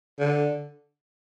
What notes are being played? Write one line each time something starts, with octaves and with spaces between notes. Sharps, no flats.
D3